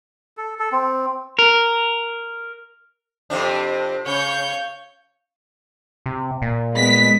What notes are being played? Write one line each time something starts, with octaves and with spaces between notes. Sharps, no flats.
A4
A4
C4
A#4
F2 C3 D4
C#3 C#5 G6
C3
A#2
G#3 B3 B6